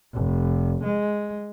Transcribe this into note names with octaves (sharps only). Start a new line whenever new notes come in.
F1
G#3